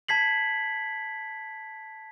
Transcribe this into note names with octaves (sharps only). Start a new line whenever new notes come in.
A5 G#6 B6 C7 F#7